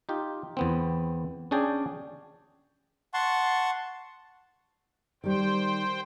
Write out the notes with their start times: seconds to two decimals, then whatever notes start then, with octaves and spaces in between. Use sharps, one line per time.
0.09 D#4 F4 G4
0.57 E2 B3 C4
1.51 C#4 D4 G#4 D5 G5
3.14 F#5 A5 C6 C#6
5.24 D#3 G3 C5 G5